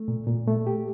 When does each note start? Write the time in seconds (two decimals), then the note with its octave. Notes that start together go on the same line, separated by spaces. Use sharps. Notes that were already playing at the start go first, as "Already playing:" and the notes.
Already playing: A3
0.08 A#2
0.27 A#2
0.48 A3
0.67 G4